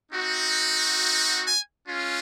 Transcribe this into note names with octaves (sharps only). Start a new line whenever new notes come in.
C4 D#4 F#4
G#5
G#3 C#4 F4